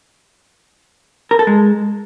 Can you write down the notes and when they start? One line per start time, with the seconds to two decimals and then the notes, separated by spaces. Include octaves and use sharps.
1.31 A#4
1.39 A4
1.47 G#3